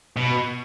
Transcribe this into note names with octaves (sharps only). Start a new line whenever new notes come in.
B2